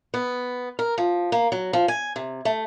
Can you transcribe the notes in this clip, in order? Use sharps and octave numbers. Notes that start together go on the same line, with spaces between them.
B3
A#4
F3
A#3
F#3
F3
G#5
C3
A3